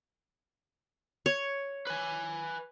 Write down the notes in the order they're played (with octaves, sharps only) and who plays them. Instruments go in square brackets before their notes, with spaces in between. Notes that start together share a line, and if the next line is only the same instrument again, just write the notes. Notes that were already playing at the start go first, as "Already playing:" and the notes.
[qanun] C#5
[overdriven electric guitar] B4 G#5